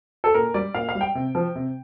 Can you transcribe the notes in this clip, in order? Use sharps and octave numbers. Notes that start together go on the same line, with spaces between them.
A4
A#2 A#4
G3 D5
A#2 F5
F5
G3
G5
C3
F3
C3